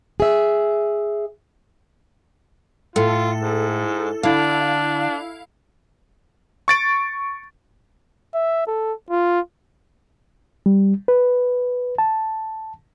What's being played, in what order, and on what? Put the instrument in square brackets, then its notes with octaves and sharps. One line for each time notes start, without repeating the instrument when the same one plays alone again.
[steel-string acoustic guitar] G#4 E5
[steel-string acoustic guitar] A2 [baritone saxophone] F4 [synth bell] A4
[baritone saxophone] G#2
[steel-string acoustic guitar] D3 [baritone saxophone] D4 [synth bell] E4 F5
[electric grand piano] C#6 A6 D7
[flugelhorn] E5
A4
F4
[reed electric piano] G3
B4
A5